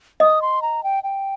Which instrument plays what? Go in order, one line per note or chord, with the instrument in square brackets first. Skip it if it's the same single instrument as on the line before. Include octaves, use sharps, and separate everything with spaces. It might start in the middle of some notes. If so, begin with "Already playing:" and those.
[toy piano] D#5 [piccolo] D#6
[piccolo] C6
A#5
G5
G5